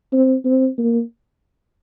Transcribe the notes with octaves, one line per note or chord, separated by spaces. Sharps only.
C4
C4
A#3